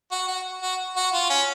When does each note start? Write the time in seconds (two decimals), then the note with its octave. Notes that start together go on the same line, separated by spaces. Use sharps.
0.11 F#4
0.28 F#4
0.62 F#4
0.96 F#4
1.13 F4
1.30 C#4